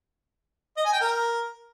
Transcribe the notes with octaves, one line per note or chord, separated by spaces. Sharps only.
D#5
G#5
G5
A#4